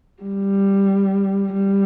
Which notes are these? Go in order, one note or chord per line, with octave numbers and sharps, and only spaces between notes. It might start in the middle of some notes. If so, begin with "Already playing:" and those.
G3
G3